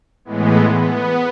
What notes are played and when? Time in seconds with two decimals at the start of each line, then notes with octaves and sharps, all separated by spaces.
0.25 A2 E3 G#3 B3
0.77 B3